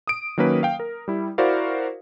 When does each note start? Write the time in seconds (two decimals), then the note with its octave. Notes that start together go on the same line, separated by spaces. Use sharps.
0.07 D#6 D7
0.38 D#3 F#3 A#3 C#4 B4
0.63 F5 G5
0.80 A#4
1.08 G3 E4
1.38 E4 F#4 A#4 C5 D5 F5